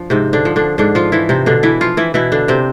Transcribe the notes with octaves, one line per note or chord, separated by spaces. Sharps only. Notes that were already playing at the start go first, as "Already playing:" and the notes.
Already playing: F3 D4
G#2 C3 C4
D3 D4
F3
D3 D4
G#2 D3 D4
F3 F4
E3 F3 E4
C3 C4
B2 D3 D4
E3 E4
F3 F4
E3 E4
B2 E3 E4
D3 D4
C3 C4